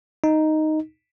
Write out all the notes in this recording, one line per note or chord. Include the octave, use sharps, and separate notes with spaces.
D#4